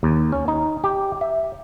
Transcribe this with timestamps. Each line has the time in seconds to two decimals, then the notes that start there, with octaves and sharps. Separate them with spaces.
0.03 D#2
0.32 C#4
0.48 D#4
0.84 G4
1.21 E5